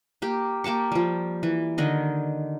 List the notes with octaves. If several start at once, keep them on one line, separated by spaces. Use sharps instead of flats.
A#3 G4
A#3 G4 A5 C#6
F3 G3
E3
D3 D#3 D#5